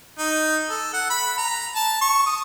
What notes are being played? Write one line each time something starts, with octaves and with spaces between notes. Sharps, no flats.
D#4
A4
F#5
B5
A#5
A5
C#6
D#6